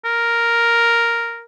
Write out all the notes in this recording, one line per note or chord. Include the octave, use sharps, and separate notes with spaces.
A#4